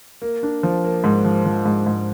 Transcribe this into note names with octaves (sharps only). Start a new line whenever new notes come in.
A#3
D4
F3
A#3
G#2
F3
F3
G#2
G#2